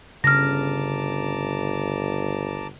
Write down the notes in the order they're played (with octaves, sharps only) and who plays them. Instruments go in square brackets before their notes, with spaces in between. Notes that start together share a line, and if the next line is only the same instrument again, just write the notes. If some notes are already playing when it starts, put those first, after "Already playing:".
[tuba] G1 [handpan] C#3 [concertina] A5 A#5 D6 [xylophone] F6 A#6